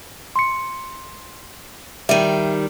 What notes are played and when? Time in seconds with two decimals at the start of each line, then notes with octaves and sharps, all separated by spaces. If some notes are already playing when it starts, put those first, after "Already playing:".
0.36 C6 C#7
2.09 D#3 G3 E5 D#7